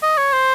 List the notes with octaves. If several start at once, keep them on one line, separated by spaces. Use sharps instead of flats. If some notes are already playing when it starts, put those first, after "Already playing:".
D#5
C#5
C5